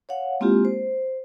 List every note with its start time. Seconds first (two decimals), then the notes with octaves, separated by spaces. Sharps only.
0.09 C#5 F5 F#5
0.40 G#3 A#3 C4 E4 F4 G4
0.65 C5